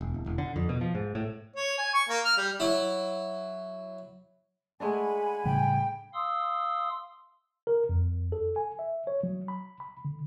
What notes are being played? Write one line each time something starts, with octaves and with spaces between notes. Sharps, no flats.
E1
D1
E1
D3
F2
B2
F3
G#2
A2
C#5
G#5
C#6
A#3
F6
G3
F#3 E4
G#3 A3 D4 F#5 G#5 B5
A2 C#3 G3 G5
F5 C6 D#6 E6
A#4
F2
A4
G#5
E5
C#5
F#3
B5
B5
D3